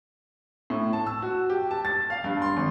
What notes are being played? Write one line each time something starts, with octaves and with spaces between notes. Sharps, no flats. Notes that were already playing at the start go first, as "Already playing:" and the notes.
A2
A5
E6
F#4
G4
A5
A6
F5
G2
C6
G#1